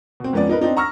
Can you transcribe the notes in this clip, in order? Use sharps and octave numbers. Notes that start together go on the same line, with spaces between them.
B2 C4
F2 G#2 B3 C#4 D5
D#4 A#4 B4
C4 D4 D#4
A#5 C#6 E6 F6 A#6